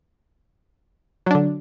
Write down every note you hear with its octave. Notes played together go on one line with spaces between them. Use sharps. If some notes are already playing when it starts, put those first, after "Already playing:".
D3 F#3 D4